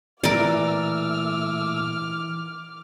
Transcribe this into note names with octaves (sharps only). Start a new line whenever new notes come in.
A#2 E3 A3 A#4 D5 D6 E6 F6